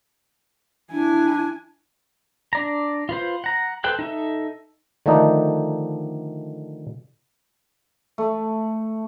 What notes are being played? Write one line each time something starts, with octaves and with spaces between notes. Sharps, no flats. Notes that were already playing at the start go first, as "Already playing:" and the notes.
D4 E4 G#5
D4 D5 A#5
F4 B4 C5
F#5 A#5
A4 B4 C5 G5 F#6
D#4 A4 E5
D3 D#3 F3 A3 D4 D#4
A3